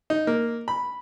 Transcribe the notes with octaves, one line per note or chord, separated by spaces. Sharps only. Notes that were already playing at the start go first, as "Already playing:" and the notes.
D#4
A#3
B5